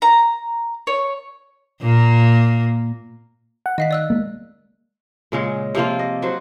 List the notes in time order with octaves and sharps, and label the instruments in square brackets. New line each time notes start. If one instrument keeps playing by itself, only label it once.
[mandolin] A#5
C#5
[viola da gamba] A#2 A#3
[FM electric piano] F#5
[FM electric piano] D#3 [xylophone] D#5 F5 B6
[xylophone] D5 E6 F#6
[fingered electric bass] G#3 A#3
[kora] A#2 C#3 G#3
C3 F3 A#3 F4
D#5
F#3 F#4 C5